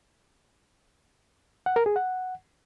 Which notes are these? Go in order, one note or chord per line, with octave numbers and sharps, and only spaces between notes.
F#5
A#4
G#4
F#5